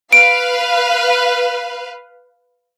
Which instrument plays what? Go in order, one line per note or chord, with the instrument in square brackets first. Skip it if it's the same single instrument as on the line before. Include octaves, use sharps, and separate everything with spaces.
[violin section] B4 F5 [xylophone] D7